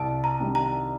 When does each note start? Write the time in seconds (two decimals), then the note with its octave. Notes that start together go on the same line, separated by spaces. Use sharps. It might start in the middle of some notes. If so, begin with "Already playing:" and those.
Already playing: C2 A5
0.24 A#5
0.40 C3 D#3 G3 D4
0.55 A#5